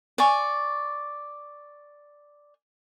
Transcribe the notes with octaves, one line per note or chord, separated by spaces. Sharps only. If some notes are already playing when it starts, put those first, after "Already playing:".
D5 G#5 C#6